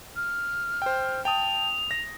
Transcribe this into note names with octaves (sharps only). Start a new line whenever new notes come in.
F6
C5 G5
G5 A5 D#6 F7
A#6